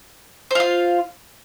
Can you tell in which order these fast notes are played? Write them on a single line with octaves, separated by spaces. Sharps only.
C5 F4 F5